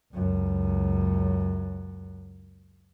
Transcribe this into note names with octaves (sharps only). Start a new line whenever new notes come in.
C#2 F#2